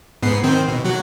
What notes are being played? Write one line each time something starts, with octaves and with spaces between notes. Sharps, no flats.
G#2 B3 C7
D#3 C4
B2
F#3 F#4